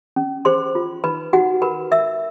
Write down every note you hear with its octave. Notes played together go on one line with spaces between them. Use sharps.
C#4
G#4 C5 C6
F4
D#4 B4 B5
D#4 F#4 F#5
A#4 B4 B5
A#4 E5 E6